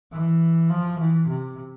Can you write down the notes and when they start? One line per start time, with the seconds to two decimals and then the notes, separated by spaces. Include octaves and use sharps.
0.13 E3
0.70 F3
0.99 E3
1.28 C3